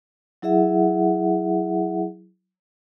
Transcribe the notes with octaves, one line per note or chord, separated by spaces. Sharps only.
F#3 E4 G#4 E5 F#5